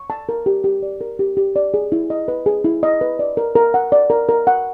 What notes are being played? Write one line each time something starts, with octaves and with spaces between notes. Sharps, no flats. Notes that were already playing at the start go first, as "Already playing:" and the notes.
Already playing: C#6
A5
A#4
G4
G4
D5
A#4
G4
G4
D5
G#4
E4
D#5
B4
G#4
E4
D#5
B4
D5
A#4
A#4
F#5
D5
A#4
A#4
F#5